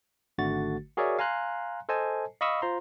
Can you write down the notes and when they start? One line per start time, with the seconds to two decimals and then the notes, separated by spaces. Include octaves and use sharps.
0.38 G#1 D3 A3 F#4 A6
0.97 F#4 G#4 A#4 C#5 D5 E5
1.19 F5 G#5 A#5 C6 F#6
1.89 A4 C5 D#5 G#5 A5
2.41 D#5 F5 B5 C#6 D#6 E6
2.62 F4 C5 A#5 C6